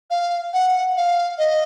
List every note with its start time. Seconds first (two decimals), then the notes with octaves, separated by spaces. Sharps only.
0.11 F5
0.53 F#5
0.97 F5
1.39 D#5